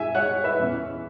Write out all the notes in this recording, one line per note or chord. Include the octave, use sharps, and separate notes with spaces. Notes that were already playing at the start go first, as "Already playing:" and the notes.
Already playing: E5 G#5
C#5 F#5
B4 E5
E2 E3 C#4